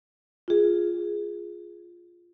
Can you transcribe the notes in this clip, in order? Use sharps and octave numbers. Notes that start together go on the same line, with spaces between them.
F4 G#4